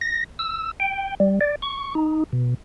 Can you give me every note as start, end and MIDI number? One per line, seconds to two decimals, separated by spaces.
0.01 0.24 94
0.39 0.71 88
0.80 1.15 79
1.20 1.39 55
1.41 1.55 74
1.62 1.94 85
1.95 2.24 63
2.33 2.54 47